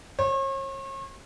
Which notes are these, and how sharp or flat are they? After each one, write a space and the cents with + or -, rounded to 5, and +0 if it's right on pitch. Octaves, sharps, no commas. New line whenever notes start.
C#5 -40